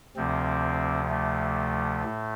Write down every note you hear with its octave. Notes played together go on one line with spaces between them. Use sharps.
D2 C3 F3 C4
A3
A2